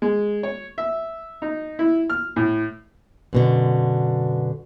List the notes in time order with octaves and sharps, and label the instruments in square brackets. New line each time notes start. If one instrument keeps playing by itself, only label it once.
[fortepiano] G#3
C#5
E5
D#4
E4
F6
A2
[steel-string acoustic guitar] F#2 B2 D3